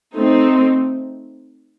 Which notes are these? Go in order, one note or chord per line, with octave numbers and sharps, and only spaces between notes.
A3 C4 D#4